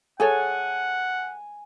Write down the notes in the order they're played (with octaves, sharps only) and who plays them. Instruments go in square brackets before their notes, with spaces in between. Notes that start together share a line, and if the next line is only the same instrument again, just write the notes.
[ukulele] G#4 A4 C#5 [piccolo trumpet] F#5 [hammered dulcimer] G#5